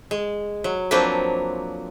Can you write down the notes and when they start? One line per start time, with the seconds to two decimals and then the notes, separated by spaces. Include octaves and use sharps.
0.11 G#3
0.64 F#3
0.91 F3 F#3 A#3 C4 D4 B4